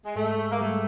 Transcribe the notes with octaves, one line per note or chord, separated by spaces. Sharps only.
G#3
G#2 A3
A#3
G3 A3